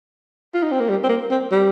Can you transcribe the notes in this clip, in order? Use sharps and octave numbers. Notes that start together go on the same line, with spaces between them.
F4
D#4
C4
A#3
G3
C4
A#3
C4
G3